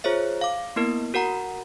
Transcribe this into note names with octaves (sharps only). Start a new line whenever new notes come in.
F4 G#4 C5 C#5 E5
F5 D6
A#3 B3 E4 A#4
F#4 A#4 F#5 A#5